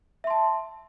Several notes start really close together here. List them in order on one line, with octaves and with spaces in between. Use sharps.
E5 C6 A5